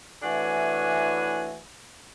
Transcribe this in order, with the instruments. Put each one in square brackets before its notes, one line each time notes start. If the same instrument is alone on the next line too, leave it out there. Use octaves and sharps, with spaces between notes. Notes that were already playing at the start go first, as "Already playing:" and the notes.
[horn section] A2 E3 D4 F#4 E5 G#5